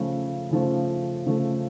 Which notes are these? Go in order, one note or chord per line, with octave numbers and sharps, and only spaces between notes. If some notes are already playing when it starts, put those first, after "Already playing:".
Already playing: C#3 F3 A3
C#3 F3 A3
C#3 F3 A3